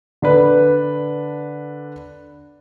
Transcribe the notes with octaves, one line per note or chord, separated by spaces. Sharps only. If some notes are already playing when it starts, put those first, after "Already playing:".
D3 D4 B4